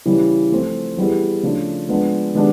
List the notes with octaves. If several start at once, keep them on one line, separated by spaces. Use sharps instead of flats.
C#3 E3 G3
F3 A3 C4 F4
E3 G3 B3 E4 G#4
C#3 F3 A3 D4
F3 G#3 B3 D4
D#3 G#3 B3 D4 G4